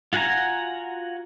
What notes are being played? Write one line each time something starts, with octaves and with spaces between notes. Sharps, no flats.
F4 F#4 F#5 G#5 A#5